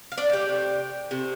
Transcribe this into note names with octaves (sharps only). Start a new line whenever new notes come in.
F5
D4 D5
F5
G4 G5
C3 A3
C3 A3